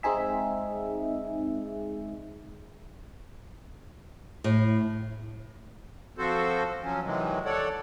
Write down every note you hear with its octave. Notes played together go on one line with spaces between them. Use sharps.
G#3 C4 D#4 G#4 E5
A2
F3 C4 F#4 A4 C5
F3 F#3 C#4
C3 D#3 E3 F#3 G#3
A4 C#5 D5 F#5